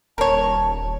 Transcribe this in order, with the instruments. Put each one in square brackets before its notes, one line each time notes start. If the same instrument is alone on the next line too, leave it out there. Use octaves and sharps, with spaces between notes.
[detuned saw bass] D#1 [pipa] A#4 C#5 [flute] A5